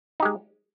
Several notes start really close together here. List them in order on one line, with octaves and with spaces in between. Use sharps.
D#4 G4 G#3